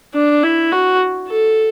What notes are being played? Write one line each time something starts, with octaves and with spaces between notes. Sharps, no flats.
D4
E4
F#4
A4